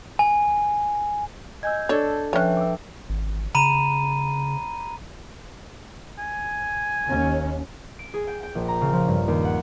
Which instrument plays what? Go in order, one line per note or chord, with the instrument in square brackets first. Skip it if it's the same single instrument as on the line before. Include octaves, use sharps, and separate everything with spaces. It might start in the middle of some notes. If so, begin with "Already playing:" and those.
[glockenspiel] G#5
[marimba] D#5 G#5 [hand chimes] E6 G6 G#6
[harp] D4 A4 [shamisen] C#5 [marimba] D5
[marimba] F3 F#6 [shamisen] C#4 C#5 [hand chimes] B4 E5 G5
[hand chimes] D6 E6
[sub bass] G#1
[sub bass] C#3 [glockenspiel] A#5 B5 D#7
[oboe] G#5
[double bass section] D#2 C#4
[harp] D7
G#4
G5
G5
A#1
A#5
C#3
F3
G2
D#2
F#5